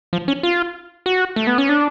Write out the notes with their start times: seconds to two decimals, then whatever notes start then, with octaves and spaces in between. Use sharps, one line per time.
0.13 F3
0.28 C#4
0.43 F4
1.06 F#4
1.36 A3
1.47 B3
1.58 C#4
1.69 D4